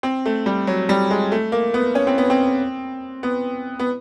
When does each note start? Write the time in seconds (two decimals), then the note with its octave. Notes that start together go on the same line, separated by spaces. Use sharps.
0.03 C4
0.26 A3
0.46 G3
0.67 F#3
0.89 G3
1.11 G#3
1.32 A3
1.52 A#3
1.74 B3
1.95 C#4
2.07 C4
2.18 B3
2.30 C4
3.23 B3
3.79 B3